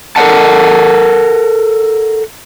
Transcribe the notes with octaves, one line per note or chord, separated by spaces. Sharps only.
A4 A#4 C5 D#5 F#5 A5